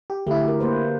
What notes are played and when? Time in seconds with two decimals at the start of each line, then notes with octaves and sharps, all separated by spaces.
0.10 G4
0.27 D3 A3 E4 G4
0.44 F#4 A#4
0.60 A#3 B4 C5